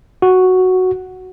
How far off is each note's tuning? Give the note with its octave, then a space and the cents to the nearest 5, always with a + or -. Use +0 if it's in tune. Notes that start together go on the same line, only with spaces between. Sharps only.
F#4 +0